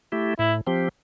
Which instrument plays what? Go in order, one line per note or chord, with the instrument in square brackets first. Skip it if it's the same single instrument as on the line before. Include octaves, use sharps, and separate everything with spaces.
[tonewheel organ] A3 E4 G4
[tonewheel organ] A2 [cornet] E4
[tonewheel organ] F3 C4 G4